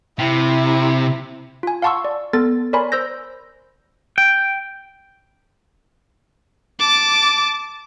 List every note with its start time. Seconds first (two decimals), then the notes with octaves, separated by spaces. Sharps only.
0.19 C3 E4
1.63 F4 G#5
1.82 F5 F#5 A5 C6 C#6 E6
2.05 D5
2.33 B3 A4 A6
2.73 A#4 C#5 D5 G#5 B5 C6
2.92 C5 E6 G6 A#6
4.18 G5
6.79 A5 D6